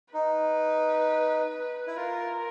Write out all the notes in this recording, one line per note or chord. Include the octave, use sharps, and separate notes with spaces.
D#4 B4
E4
F4 A#4